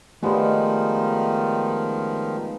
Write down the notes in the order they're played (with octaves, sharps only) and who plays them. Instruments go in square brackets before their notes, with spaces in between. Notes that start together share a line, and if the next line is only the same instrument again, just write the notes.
[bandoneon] D#3 F3 [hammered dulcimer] G#3 B3 [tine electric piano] A3 G4 D5